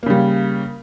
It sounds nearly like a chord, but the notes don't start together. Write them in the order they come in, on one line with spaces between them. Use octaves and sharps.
A#3 C#3 G3